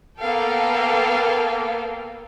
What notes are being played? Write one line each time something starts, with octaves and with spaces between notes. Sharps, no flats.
A#3 B3 A4 F5 G5